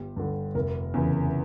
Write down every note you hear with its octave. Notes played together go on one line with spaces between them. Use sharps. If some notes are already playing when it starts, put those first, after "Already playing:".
Already playing: G1 G4
G2 D3
F1 A#4
E2 C#3 E3